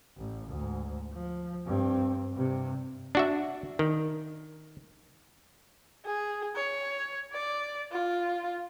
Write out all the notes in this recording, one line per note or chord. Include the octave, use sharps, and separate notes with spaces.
A1
D2 G#2
F3
G2 C4
G2 C3
D4 F#4 E5
D#3
G#4
C#5
D5
F4